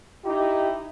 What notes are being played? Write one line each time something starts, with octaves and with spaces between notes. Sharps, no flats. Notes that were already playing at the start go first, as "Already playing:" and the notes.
D#4 E4 G4